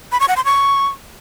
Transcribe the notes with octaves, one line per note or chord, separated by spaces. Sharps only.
B5
C#6
F#5
C6
C#6